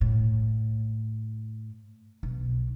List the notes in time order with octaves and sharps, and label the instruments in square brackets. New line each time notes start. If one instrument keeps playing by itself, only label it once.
[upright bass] A2
B1